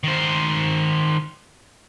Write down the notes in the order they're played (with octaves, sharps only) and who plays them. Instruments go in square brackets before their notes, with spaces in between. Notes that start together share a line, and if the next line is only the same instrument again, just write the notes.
[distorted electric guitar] D#3 C5